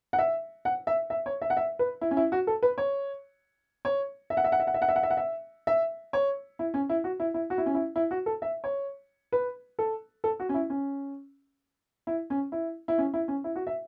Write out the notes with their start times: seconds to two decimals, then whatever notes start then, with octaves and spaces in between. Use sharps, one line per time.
0.13 F#5
0.19 E5
0.65 F#5
0.87 E5
1.10 E5
1.26 C#5
1.42 E5
1.50 F#5
1.57 E5
1.79 B4
2.01 E4
2.11 C#4
2.17 E4
2.32 F#4
2.47 A4
2.63 B4
2.78 C#5
3.85 C#5
4.30 E5
4.37 F#5
4.44 E5
4.52 F#5
4.60 E5
4.67 F#5
4.74 E5
4.82 F#5
4.88 E5
4.96 F#5
5.03 E5
5.10 F#5
5.17 E5
5.67 E5
6.13 C#5
6.59 E4
6.74 C#4
6.89 E4
7.04 F#4
7.20 E4
7.34 E4
7.50 F#4
7.58 E4
7.66 C#4
7.75 E4
7.96 E4
8.11 F#4
8.26 A4
8.42 E5
8.64 C#5
9.32 B4
9.79 A4
10.24 A4
10.40 F#4
10.49 C#4
10.54 E4
10.70 C#4
12.07 E4
12.30 C#4
12.52 E4
12.88 E4
12.98 C#4
13.14 E4
13.28 C#4
13.44 E4
13.56 F#4
13.67 E5